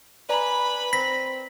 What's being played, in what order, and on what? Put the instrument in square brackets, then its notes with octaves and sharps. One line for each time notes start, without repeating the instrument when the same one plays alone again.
[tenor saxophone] B4 [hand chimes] D5 G#5 A#5 [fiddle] B5
[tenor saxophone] C4 [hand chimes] A#6 [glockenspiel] B6